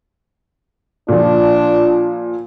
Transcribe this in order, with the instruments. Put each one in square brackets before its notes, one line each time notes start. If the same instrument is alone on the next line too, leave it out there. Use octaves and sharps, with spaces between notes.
[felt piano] A#2 F3 [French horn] D4